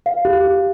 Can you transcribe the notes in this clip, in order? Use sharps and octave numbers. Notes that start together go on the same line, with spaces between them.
F5
G4
G4